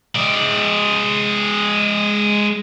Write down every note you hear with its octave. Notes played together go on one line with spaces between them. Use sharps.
G#3 D5